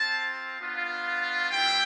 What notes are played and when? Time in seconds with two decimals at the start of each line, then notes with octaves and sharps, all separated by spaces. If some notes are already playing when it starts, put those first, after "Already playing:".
Already playing: C4 F4 A5
0.61 B3 D4 F4
1.51 G3 C4 E4 G5